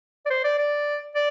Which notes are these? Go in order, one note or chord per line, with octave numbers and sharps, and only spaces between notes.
D5
C5
D5
D5
D5